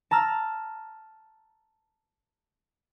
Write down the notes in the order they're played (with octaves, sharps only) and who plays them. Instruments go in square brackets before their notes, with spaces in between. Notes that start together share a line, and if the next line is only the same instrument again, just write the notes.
[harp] A5 A#5 E6 F6